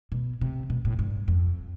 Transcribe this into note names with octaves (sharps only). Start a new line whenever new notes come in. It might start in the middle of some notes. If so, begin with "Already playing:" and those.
B2
C3
B2
A2
G2
F2